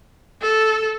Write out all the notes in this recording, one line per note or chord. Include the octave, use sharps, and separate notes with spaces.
A4